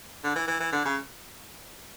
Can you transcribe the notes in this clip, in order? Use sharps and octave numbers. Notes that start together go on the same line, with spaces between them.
D3
E3
E3
E3
D3
C#3